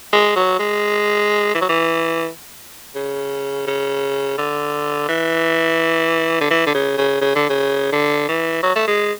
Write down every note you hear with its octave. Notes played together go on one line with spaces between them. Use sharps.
G#3
F#3
G#3
E3
F#3
E3
C#3
C#3
D3
E3
D3
E3
D3
C#3
C#3
C#3
D3
C#3
D3
E3
F#3
A3
G#3